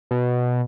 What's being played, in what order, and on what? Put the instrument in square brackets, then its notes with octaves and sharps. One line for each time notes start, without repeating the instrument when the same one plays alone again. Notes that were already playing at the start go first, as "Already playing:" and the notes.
[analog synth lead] B2